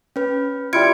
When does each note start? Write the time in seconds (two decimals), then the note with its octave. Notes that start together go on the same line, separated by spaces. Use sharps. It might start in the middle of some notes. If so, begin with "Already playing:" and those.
0.16 C#4 B4
0.73 G3 E4 F4 G#6 C#7 D7